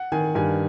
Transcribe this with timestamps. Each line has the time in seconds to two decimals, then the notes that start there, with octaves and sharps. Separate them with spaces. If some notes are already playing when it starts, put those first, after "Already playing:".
Already playing: F#5
0.12 D#3 G#5
0.35 G2 G#5